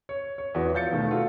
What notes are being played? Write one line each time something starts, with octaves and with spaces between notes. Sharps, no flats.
C#5
C#5
E2 E3 F#4
F3 F5 G6 A6 C#7
B2 D#3 A3
F4 F#4 A4